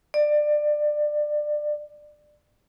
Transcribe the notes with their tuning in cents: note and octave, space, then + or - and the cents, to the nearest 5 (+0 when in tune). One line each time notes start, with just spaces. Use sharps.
D5 +20